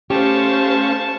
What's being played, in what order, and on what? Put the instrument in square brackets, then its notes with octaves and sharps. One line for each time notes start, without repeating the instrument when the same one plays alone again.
[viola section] A3 C5 F5 [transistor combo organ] C#4 [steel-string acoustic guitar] G4 [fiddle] A5 C#6